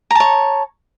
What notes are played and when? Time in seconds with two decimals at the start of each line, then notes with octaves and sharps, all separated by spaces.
0.11 A#5
0.15 A5
0.20 C#5